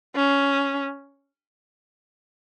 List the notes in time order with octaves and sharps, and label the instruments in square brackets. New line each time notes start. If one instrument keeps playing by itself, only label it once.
[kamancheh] C#4